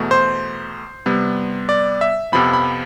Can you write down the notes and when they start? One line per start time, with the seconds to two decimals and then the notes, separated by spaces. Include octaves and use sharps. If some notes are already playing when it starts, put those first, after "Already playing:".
Already playing: E2 B2 A3
0.11 C5
1.06 C3 G3 B3
1.69 D5
2.01 E5
2.32 F2 C3 F3 B3 B5
2.53 B5